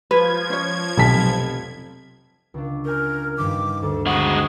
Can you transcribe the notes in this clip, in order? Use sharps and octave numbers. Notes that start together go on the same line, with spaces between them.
F3 B4 G#6
C#4 C#5
F1 B1 A4 G#5 A5 B6
C#2 D4
A#4 G#5 G6
G2 D#3 D6
D2 A4
G#3 F#4 D#6